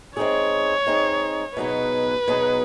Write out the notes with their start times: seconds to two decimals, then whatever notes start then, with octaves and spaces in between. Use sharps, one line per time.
0.17 G#3 C4 D#4 G#4 C#5
0.87 G#3 C4 D#4 G#4
1.57 B2 F#3 B3 D#4 G#4 B4
2.28 B2 F#3 B3 D#4 G#4